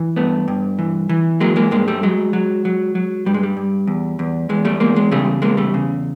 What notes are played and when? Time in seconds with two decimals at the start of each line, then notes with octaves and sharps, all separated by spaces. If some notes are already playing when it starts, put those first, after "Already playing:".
Already playing: E3
0.16 G2 A3 B3
0.48 G2
0.79 E3
1.09 E3
1.40 F#3 G#3 A#3
1.56 G#3 A#3
1.71 G2 G#3 A#3
1.88 G3 A3
2.03 F#3 G#3
2.33 F#3
2.65 F#3
2.95 F#3
3.26 G2 G3
3.34 G#3
3.43 G3
3.57 G2
3.87 E2
4.19 E2
4.49 E2 G#3
4.65 G3 A3
4.80 E2 G#3 A#3
4.96 G#3
5.11 C#3 G3 A3
5.42 E2 G#3 A#3
5.57 G3 A3
5.74 C#3